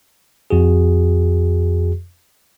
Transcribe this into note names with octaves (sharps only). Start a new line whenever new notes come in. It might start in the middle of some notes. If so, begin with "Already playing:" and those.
F2 F#4 G#4